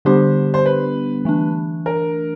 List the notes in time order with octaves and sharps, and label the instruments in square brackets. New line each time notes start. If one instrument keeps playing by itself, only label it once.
[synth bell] D3 G3 B3 D4 G4 [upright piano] C5
[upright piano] C5
B4
[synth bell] E3 A3 D4
[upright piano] A#4